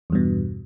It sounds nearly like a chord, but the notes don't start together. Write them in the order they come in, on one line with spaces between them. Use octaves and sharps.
E2 G2 B2